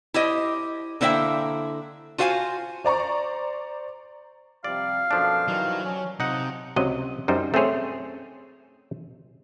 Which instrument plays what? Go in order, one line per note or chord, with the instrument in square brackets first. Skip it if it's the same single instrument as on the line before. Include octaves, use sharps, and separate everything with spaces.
[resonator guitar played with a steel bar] E4 G4 C5 D#5
D3 A#3 E4 C5 E5 G5
F4 F#4 C5 F5 F#5 G#5
[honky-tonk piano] C5 D5 A#5 C#6
[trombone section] C3 F3 G3 [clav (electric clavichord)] D5 [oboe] F5
[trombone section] F#2 B2 A4 [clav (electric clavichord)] F3 D4
[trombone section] D#3 E3 G3 [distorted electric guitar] F#3
[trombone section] C#4
[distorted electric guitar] C3 [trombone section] F3 [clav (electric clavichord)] D#4 F#5
[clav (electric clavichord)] C#2 C3 F#3 D#5
F#2 G3 D#4 C5
A3 C4 C#4 G#4 C5 C#5